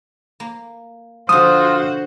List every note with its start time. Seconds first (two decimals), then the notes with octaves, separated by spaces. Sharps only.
0.40 A#3
1.29 D3 F3 F4 F#4 C5 D#6